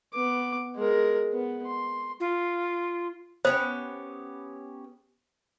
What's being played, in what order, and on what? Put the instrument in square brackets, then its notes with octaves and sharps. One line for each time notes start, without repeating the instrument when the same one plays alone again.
[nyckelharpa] B3 D6
G#3 A#4
B3
C6
[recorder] F4
[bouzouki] B3 C#4 G4 [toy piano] C5